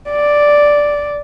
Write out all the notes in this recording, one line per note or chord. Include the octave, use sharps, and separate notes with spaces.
D5